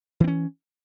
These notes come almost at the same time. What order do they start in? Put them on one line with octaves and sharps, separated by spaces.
E3 C4 C#4